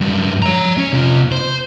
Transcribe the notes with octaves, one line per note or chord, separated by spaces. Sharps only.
G2 F#3
C#5 A#5
C#4
C3 F4
C5